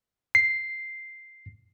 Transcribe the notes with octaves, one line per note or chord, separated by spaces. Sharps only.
C7